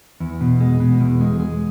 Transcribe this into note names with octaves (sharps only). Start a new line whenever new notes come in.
E2
B2
G#3
B2
E2
G#3
G#3